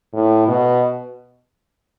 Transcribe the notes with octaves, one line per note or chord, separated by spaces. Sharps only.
A2
B2